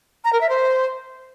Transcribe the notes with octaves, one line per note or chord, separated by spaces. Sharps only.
A#5
A#4
E5
C5